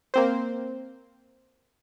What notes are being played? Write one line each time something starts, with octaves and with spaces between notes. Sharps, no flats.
A#3 C4 C5